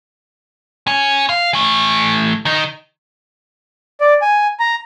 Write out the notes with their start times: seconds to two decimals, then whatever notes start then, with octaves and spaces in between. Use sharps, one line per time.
0.87 C#4 G#5
1.29 F5
1.53 E3 A3
2.45 D#3 D#4
4.00 D5
4.22 G#5
4.60 A#5